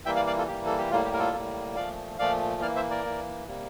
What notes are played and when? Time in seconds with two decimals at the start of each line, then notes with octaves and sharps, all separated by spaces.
0.05 E3 G3 A#3 E5 G5
0.16 D5 F5
0.27 D5 F5
0.38 F4 A4
0.48 E3 G3 A#3 G4
0.66 A4
0.78 G4
0.91 A2 G3 A#3 F4
1.05 G4
1.13 A#4
1.19 F4 A4
1.33 A2 G3 A#3
1.76 A#2 F3 A3 D5 F5
2.19 A#2 F3 A3 D5 F5
2.61 E3 A#3 D5 F5
2.76 C5 E5
2.90 A#4 D5
3.05 E3 A#3
3.47 C3 G3 A#3